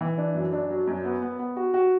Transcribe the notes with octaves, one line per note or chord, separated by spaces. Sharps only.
E3
D4
F#2
D4
F#3
F#2
B3
B3
B3
F#4
F#4